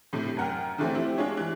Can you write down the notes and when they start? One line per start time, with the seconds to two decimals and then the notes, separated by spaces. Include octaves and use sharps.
0.13 A2 C3 A3 E4
0.37 F#2 A#4 F#5 G5 F6
0.78 D3 E3 F3 A3 C4
0.95 C4 E4 G4
1.18 G#3 D4 F4 G#4 C#5
1.37 E3 G#3